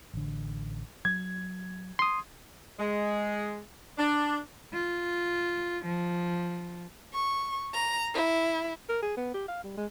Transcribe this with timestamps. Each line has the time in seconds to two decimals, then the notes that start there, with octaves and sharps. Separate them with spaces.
0.14 A1 D3
1.05 F#3 G#6
1.99 C6 D#6
2.78 G#3
3.97 D4
4.73 F4
5.85 F3
7.14 C#6
7.74 A#5
8.15 E4
8.89 A#4
9.02 G#4
9.17 B3
9.34 G4
9.48 F5
9.64 G3
9.77 G#3